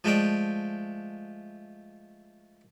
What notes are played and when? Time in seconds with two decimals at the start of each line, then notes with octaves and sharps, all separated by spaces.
0.04 F3 G#3 A3 D5 G5